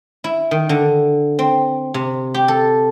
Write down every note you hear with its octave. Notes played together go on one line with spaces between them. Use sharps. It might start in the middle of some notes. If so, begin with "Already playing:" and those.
E4
D#3
D3
C4
C3
G4
A4